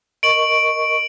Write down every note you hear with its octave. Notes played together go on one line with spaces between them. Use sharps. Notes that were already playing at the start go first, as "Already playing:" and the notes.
A#4 D#5 C#6 D7 F#7